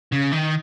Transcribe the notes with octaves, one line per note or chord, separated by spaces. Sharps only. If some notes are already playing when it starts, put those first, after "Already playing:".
C#3
D#3